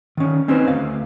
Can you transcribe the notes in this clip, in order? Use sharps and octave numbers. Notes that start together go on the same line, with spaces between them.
D#3 C#4
C4 C#4 D#4 B4 C5
D2 F5